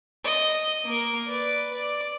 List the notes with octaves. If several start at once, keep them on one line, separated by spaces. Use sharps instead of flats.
D#5
A#3 A#4
B4 D5
D5